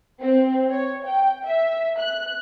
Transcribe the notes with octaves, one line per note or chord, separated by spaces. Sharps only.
C4
C#5
G5
E5
F#6